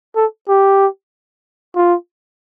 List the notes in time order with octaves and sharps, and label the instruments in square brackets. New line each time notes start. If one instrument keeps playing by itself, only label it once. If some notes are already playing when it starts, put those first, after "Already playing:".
[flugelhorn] A4
G4
F4